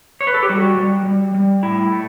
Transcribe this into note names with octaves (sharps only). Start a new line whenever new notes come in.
C#5
B4
A4
G4
G3 F#4
G3
G3
G3
A2 E4
A3